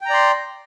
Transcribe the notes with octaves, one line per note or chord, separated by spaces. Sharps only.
D5 G5 A#5 C6